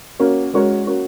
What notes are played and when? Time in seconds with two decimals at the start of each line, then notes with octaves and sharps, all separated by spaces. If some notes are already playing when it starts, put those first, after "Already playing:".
0.19 A#3 C#4 F#4 A#4
0.54 G#3 C#4 F#4 A#4 C#5
0.87 A#3 C#4 F#4